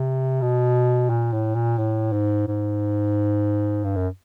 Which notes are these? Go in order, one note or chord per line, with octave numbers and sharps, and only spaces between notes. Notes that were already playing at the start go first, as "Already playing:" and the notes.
Already playing: C3
B2
A#2
A2
A#2
A2
G#2
G#2
G2
F#2